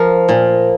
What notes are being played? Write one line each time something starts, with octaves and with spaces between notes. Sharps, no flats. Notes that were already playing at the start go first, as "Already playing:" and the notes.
Already playing: F3 A#4
A#2